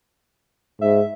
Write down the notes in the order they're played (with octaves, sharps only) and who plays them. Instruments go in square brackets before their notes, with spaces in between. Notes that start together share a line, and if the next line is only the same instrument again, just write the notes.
[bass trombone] G#2 [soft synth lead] E5